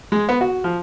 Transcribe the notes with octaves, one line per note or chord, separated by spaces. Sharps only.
G#3
B3
F#4
F3